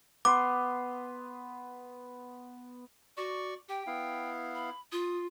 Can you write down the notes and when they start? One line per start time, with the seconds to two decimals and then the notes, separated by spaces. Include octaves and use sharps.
0.25 B3 C6 D6
3.17 F#4 D5 C#6
3.69 G4 G5
3.87 B3 E4 F5
4.55 B5
4.92 F4 D#6